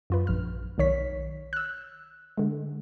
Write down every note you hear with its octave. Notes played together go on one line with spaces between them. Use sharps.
F#2 F4 B4
A#1 F6
B1 D#3 C#5 B6
E6 F#6
D3 G#3